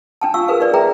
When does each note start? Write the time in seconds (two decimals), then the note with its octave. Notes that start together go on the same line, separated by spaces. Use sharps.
0.21 D4 G5 A5
0.34 F4 F5 C#6 E6
0.48 G#4 A#4 B4 F5
0.60 D#4 B4 D5
0.74 G#4 B4 E5 G5 A#5